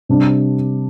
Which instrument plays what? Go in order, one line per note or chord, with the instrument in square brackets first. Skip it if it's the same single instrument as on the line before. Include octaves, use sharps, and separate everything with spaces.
[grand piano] C3 G3 D4